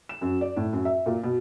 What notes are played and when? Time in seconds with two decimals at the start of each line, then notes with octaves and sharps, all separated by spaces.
0.09 E7
0.21 F#2
0.41 D5
0.57 A2
0.73 F#2
0.85 E5
1.06 A#2
1.24 B2